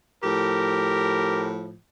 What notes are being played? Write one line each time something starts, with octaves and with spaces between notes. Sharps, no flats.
A2 F3 G4 A#4